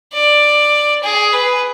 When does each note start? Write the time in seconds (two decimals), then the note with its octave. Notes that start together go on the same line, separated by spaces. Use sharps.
0.13 D5
1.03 G#4
1.33 B4